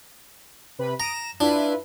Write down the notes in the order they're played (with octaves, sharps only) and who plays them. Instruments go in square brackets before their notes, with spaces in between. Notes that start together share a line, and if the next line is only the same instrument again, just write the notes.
[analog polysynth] C3 B4 B5
[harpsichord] A#5 [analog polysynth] D#6 D7 E7
[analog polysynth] E7
[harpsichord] D4 [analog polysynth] E4 F4 B4